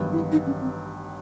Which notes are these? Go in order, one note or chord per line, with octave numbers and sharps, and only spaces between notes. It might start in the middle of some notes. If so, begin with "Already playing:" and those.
Already playing: A1 G2 D#3 F#3 B3
E4
D#4
C#4
C4